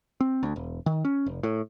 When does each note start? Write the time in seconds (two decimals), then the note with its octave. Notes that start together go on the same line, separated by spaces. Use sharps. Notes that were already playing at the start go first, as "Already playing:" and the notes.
0.21 C4
0.43 D2
0.56 E1
0.86 D#3
1.05 C#4
1.26 F1
1.43 A2